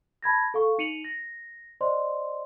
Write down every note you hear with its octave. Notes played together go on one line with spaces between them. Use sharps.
A5 B5 G#6 A#6
A4 F5 C#6
D#4 C#7 D#7 F7 F#7
A#6
C5 D5 D#5 C6